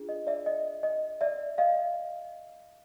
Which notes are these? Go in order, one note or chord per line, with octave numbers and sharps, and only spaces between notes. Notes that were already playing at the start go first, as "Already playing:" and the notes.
Already playing: D4 F4 G#4
D#5
D5 E5
D#5
D#5
D5 E5
D#5 F5